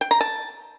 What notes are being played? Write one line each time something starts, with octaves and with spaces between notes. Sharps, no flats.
G5
A#5
A5